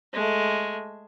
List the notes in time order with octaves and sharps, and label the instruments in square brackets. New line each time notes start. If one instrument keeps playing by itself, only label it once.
[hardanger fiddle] G#3 A3